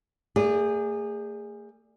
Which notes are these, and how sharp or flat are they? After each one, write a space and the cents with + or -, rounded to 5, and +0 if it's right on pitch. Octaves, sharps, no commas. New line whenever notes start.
A3 +40 G#4 -20 D5 +0